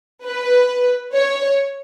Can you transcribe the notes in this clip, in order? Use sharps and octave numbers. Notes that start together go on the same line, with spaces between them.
B4
C#5